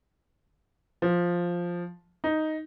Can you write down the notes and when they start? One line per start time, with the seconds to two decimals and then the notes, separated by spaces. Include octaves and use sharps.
1.02 F3
2.24 D#4